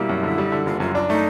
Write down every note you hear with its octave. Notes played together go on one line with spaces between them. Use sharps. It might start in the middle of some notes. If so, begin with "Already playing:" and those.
Already playing: B2 G3 A#3 E4
F#2
D3
G3
D3
F#1 F4
F#2 F4
D4 F4
A3 D#4